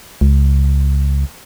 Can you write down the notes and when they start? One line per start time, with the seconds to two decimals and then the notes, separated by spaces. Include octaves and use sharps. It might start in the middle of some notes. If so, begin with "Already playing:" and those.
0.21 C#2